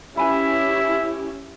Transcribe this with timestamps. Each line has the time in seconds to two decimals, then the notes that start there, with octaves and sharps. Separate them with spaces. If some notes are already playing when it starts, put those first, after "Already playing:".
0.17 C#4 E4 G4 B4 E5 G#5 B5